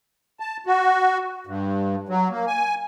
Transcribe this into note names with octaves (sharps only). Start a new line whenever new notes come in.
A5
F#4
G2
F#3
A#3
G#5